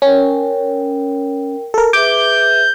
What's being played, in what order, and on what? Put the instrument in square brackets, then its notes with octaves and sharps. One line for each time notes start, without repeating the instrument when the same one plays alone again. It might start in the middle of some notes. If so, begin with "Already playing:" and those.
[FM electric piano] C#4 [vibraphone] A#4 G5
[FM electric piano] A4 A#4
[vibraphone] G#4 B4 E5 [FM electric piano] D6 [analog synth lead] G6